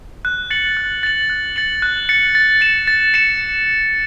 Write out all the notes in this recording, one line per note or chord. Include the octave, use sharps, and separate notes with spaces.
F#6
A6 C#7 F#7
F#6
A6 C#7 F#7
F#6
A6 C#7 F#7
F#6
A6 C#7 F#7
A6
C#7 E7
A6
C#7 E7